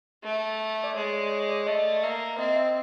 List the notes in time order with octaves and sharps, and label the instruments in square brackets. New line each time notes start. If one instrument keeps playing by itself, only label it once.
[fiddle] A3
[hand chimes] D5
[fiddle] G#3 [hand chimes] C#5
[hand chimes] C#5
C#5
D5
[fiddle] A3 [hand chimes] D#5
[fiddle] A#3 [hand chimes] E5
[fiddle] C4 [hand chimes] D#5
[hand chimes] E5